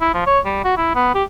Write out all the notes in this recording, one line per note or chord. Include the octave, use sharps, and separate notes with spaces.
E4
F3
C#5
G3
F#4
E4
B3
G4